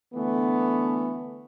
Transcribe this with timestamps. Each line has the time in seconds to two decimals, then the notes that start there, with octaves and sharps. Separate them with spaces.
0.14 D3 E3 A3 B3